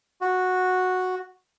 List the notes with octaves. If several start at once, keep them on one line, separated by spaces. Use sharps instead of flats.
F#4